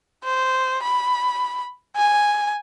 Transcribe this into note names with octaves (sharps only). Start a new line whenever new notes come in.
C5
B5
G#5